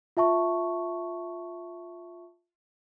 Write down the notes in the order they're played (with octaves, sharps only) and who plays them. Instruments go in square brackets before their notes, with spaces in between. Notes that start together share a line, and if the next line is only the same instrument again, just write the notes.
[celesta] F4 E5 A5 C#6